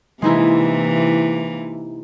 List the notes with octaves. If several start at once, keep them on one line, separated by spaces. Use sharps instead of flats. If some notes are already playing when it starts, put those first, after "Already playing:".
C3 E3 G#3 A#3 D#4 E4